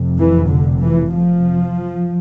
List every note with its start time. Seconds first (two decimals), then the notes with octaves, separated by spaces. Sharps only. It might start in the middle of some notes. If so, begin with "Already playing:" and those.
Already playing: F1 F2 C3
0.19 E3
0.50 D3
0.82 E3
1.13 F3